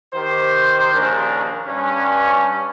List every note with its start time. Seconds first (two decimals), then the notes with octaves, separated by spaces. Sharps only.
0.13 D#3 G4 C5
0.93 A#1 D#2 C#4 D4 A#4
1.67 G2 C#4